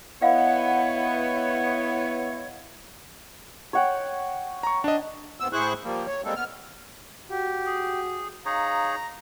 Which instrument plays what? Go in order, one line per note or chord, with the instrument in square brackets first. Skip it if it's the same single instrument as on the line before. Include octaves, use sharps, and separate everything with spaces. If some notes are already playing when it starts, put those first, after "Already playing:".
[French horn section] B3 [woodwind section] E4 C#5 [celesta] D#5 F5 F#5
[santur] C#5 F#5 G5
[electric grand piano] A#5 C#6
D4 D#5
[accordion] G2 B3 C4 E6
A2 E4 G#4 C5 C#6 F#6
F3 G3 A#3
C#5
G3 G#3 A#3 C4 A4
B3 F6
[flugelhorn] F#4 [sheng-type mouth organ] G4
[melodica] G#4
[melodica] D#4 G#4 C#5 [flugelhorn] F5 [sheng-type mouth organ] A#5